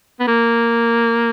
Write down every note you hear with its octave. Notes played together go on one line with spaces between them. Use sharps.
B3
A#3